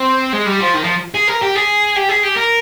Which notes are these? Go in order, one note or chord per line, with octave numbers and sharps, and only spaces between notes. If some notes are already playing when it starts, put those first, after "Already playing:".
Already playing: C4
G#3
G3
F3
D#3
F3
G#4
A#4
G4
G#4
G4
G#4
G4
A#4